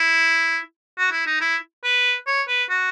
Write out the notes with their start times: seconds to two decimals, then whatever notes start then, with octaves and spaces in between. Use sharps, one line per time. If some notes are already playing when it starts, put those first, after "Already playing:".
Already playing: E4
0.98 F#4
1.12 E4
1.27 D#4
1.41 E4
1.84 B4
2.27 C#5
2.48 B4
2.70 F#4